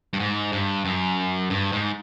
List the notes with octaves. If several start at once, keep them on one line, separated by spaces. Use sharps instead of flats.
G2
G#2
G2
F#2
G2
G#2